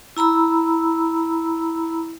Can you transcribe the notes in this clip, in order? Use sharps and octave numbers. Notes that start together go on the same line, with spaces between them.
E4 A#5 B5 E6